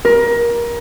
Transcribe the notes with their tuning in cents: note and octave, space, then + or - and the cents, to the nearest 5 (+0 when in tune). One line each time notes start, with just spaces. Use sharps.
A#4 +25